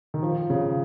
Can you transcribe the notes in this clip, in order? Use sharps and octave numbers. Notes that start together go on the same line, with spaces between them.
D#3
F3
C#3